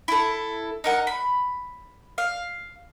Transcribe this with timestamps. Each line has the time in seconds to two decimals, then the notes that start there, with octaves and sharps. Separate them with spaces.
0.08 E4 A4
0.84 D#4 A#4 F#5
1.07 B5
2.18 F5